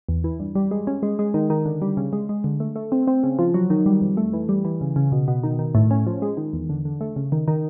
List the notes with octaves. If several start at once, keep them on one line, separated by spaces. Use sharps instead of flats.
E2
E3
G2
G3
G#3
C#4
G#3
G#3
D#3
D#3
D3
G3
C#3
G#3
G#3
D3
A3
A3
C4
C4
C#3
F3
F#3
D#3
G3
F2
A3
E3
G3
E3
C#3
C#3
B2
B2
D#3
D#3
A2
C#4
F3
G#3
D#3
E2
D3
D3
A3
C#3
D#3
D#3